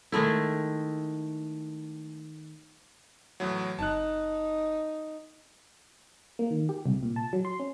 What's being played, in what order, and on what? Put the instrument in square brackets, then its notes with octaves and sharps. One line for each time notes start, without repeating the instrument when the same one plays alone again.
[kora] D#3 G#3 A3 E4
[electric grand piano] E2 A2 F#3
[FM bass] F#1 [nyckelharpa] D#4 [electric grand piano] A5 F#6
[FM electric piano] A#3
D#3
G4
C2
A#2
A5
F#3
C6
C#4